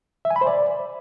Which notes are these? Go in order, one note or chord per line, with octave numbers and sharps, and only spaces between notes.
E5
G#5
B5
C5
D5